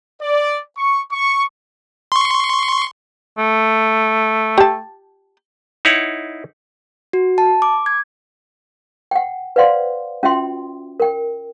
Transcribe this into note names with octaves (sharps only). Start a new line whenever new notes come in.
D5
C#6
C#6
C6 C#6
A3
G4 A5
D#4 E4 C#5 F#5
F#4
A5
D6
G#6
F#5 G5
B4 C5 D5 F5 F#5 C6
C#4 F4 F#4 E5 G5 C6
A#4 G5